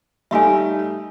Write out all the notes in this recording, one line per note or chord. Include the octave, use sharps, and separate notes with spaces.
G3 A3 D#4 E5 F5 G#5